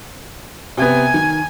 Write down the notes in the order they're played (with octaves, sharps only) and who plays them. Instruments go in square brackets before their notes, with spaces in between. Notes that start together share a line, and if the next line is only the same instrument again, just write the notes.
[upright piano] C3 B3 [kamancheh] G#5
[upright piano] D#3